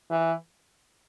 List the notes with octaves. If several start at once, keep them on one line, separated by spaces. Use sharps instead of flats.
E3